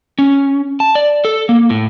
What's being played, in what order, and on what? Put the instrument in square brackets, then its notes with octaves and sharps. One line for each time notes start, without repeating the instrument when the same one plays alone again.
[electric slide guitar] C#4
A5
D5
A4
A#3
A2